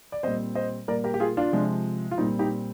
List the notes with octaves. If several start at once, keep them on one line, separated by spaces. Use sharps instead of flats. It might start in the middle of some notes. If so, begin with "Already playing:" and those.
D5
A#2 G3 C4 C5 D#5
C5 D#5
A#2 G3 A#3 A#4 D5
G4 A#4
G4
F4 G#4
D4 F4
C3 F3 G#3
F4
A#2 G3 C4 D#4
D#4 G4